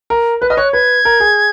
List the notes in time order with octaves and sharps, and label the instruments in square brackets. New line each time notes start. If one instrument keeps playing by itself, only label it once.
[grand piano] A#4
[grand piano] B4 [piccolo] F#6
[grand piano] D#5 [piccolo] F6
[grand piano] C#5 [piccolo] F#6
[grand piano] B4 [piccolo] G#6
[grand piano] A#4
G#4